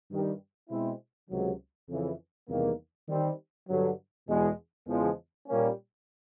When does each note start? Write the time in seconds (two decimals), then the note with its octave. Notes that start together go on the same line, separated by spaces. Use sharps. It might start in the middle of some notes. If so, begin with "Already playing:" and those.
0.11 G2 D#3 G3
0.70 B2 G#3 C4 E4
1.30 C#2 C3 D#3 F#3
1.89 F2 C#3 E3
2.49 E2 C3 D#3 G3 A#3
3.09 D#3 G3 C4
3.69 G2 D3 F#3
4.28 E2 B2 G#3
4.88 E2 C#3 F3 G#3
5.47 A#2 G3 A#3 C#4